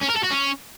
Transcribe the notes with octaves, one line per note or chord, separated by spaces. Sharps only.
C#4
A#4
A4
F#4
C#4